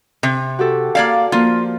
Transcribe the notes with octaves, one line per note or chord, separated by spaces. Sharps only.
C3
F#4 G4 A4
A#3 D5 F5
F3 A#3 F4